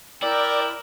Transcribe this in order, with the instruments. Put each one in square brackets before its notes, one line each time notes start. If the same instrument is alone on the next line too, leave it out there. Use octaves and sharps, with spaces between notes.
[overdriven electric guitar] E4 [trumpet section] A#4 G5 [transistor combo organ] D5